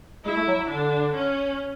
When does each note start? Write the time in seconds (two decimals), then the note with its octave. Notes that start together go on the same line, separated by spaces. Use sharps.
0.25 G#3 E4
0.36 A3
0.47 F#3
0.70 D3 D4
1.15 C#4